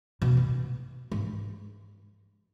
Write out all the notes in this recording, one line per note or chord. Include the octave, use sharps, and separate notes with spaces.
B2
A#2
G#2